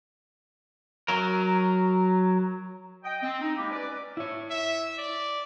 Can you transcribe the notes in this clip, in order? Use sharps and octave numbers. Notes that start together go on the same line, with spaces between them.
F#3 A#4
D#5 G5
C4
D#4
G#3 A#3 D#4 E4 G4
C#4 B4 D5
E4 C#5
E5
D5